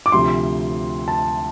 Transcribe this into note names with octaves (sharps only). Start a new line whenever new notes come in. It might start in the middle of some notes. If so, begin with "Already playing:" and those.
D6
D2 C3 F3 C6
A5